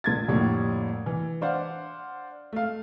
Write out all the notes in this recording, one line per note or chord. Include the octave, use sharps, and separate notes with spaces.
A#1 G#6 A6
F2 A2 D3 G3 A#3
E3
D4 C5 F5 F#5
A3 F5